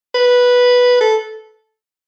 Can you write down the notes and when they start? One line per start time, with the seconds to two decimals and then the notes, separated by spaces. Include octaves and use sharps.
0.14 B4
1.01 A4